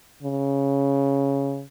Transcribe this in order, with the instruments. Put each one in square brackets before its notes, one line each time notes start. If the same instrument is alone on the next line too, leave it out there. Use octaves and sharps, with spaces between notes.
[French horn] C#3